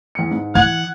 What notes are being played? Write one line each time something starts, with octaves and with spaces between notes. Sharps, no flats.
E2 C#7
G#2
E3 F#5 G#6